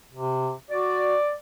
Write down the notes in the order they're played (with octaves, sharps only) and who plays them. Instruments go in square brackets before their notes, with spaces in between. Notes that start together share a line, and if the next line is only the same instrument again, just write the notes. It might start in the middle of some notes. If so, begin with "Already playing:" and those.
[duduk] C3
[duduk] F#4 [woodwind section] D5